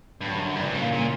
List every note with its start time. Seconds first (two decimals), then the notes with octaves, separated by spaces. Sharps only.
0.22 G2 D3 F#3
0.40 F#2
0.56 G2 C#3 E3
0.75 A#2
0.93 A#2